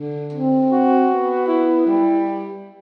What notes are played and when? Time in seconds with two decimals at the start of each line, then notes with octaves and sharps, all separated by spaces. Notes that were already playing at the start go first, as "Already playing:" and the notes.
Already playing: D3
0.32 C4
0.70 F#4
1.09 B3
1.48 E4
1.87 G3